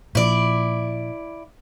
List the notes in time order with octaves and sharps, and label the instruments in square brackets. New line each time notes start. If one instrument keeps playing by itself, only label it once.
[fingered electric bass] A#2 F3 [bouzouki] E4 D5